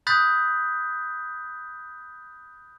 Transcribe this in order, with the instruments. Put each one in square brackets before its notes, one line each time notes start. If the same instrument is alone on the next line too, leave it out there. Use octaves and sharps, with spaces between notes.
[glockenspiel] B5 D#6 F#6 G6 A6 B6